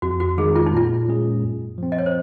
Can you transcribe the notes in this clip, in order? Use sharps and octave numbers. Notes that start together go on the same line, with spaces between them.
F2 F#4
F#4
D#3 G#3 D#4 G#4
F4
D#4
A#2 F4
G#3 C#4 G#4
F#2
F3 C4
D#5
C#5
C5